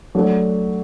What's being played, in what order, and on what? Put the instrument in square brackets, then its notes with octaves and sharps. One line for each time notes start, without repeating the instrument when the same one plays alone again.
[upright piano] F#3 A3 D4